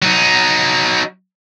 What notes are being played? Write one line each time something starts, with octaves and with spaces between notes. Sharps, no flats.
F#3 D#4